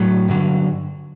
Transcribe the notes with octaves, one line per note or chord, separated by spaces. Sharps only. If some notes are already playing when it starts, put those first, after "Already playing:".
Already playing: A2 F#3
G2 D3 F#3